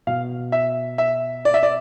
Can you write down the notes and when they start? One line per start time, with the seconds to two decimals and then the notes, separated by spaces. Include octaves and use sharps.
0.07 B2 F5
0.52 E5
0.98 E5
1.45 D5
1.54 E5
1.63 D5